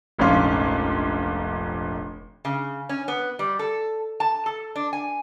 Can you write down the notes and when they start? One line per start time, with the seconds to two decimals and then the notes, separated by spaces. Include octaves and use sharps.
0.19 F1 A#1 G#2 C#4 F5 C6
2.45 C#3
2.89 C#4
3.08 B3
3.39 G3
3.59 A4
4.20 A5
4.46 A4
4.76 D4
4.93 G#5